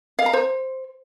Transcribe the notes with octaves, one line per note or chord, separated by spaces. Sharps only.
F5
A#5
C5